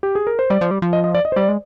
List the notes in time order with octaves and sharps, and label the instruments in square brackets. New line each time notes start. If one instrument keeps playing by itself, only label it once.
[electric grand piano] G4
G#4
A#4
C5
[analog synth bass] G3 [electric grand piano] D5
[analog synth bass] F3
G3
F3
[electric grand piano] D#5
D#5
D5
D#5
C5
[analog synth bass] G3 [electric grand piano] D5
[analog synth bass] G#3